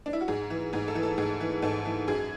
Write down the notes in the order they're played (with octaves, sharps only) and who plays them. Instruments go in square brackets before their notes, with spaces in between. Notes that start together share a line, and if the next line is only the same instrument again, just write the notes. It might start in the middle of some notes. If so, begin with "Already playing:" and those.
[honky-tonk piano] D4
E4
F#4
G#2 G#4
E3
G#2 G#4
A4
E3
A4
G#2 G#4
E3
G#2 A4
E3
F#2 G#4